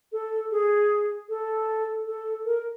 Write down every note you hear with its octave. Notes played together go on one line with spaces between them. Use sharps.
A4
G#4
A4
A4
A#4